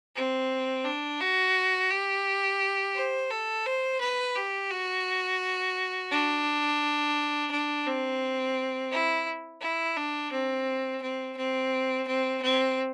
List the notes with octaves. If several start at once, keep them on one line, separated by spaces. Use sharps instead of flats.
C4
D4
F#4
G4
C5
A4
C5
B4
G4
F#4
D4
D4
C4
E4
E4
D4
C4
C4
C4
C4
C4